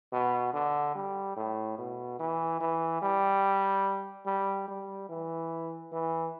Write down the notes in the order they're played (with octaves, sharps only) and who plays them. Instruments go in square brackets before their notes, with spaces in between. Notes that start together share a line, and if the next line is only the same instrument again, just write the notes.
[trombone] B2
D3
G3
A2
B2
E3
E3
G3
G3
G3
E3
E3